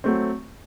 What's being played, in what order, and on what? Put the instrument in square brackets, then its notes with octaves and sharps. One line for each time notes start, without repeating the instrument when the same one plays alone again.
[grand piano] F#3 A3 C4